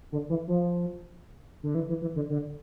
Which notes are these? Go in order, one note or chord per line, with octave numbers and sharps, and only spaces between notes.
D3
E3
F3
D3
E3
E3
E3
D3
D3